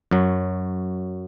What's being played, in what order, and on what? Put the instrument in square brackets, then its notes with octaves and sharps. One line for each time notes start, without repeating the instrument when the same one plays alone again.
[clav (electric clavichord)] F#2 F#3